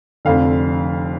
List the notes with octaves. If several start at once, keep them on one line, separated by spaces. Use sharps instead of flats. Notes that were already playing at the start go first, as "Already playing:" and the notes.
F1 F2 D3 F5